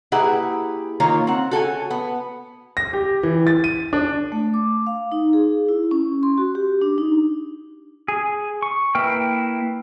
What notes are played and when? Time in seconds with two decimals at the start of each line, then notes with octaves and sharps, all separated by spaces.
0.12 A#3 E4 G4 G#4 B4 F#5
1.00 D#3 A#3 F4 C#5
1.27 C4 F#5
1.51 F#4 A4 C#5 G#5
1.90 B3
2.77 A#6
2.93 G4
3.23 E3
3.47 A6
3.64 D#7
3.93 D4
4.32 A3
4.54 D6
4.87 F5
5.12 D#4
5.33 G#4
5.69 E4
5.91 C#4
6.23 C6
6.38 F#4
6.55 G4
6.82 D4
6.98 D#4
8.08 G#4
8.62 C#6
8.95 A#3 E4 B4 G5 F6